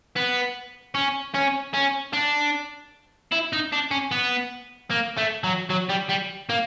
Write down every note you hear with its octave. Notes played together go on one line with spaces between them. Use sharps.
B3
C#4
C#4
C#4
D4
E4
D#4
D4
C#4
B3
A#3
A3
F#3
F#3
G3
G3
A#3